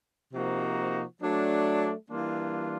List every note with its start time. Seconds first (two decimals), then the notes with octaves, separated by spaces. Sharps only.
0.33 C3 F3 A#3 D#4 F#4
1.22 F#3 A3 D4
2.11 E3 G3 A#3 D4 F4